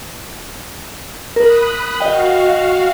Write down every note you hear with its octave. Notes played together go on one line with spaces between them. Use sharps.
A#4 B5 D#6 F#6
F#4 D#5 F5 G5